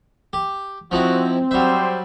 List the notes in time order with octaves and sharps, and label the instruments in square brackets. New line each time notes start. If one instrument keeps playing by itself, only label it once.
[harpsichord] G4
[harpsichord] F3 D#4 E4 [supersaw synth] C4 [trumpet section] F#4
[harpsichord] F#3 E5 [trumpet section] G3 C5